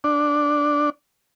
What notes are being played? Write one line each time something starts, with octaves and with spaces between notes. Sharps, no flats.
D4